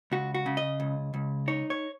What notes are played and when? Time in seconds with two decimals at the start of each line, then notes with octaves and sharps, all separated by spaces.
0.12 C#2 F#4
0.34 F#4
0.46 C#3
0.57 D#5
0.80 C#2
1.14 C#2
1.48 D#4 C#5
1.70 C#5